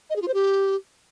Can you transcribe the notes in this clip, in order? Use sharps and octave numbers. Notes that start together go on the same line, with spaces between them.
D#5
G#4
F4
C5
G4